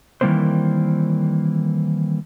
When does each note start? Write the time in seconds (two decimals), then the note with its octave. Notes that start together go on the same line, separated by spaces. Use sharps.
0.21 D#3 E3 G3 A#3 C4 C5